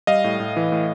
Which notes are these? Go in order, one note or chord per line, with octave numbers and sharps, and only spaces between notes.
G3 D#5 F5
A2
A2
E3
A2